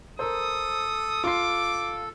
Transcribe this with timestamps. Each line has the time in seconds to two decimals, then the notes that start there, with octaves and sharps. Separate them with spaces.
0.19 A4 A#4 C5 D#6
1.24 F4 C6 D6 C7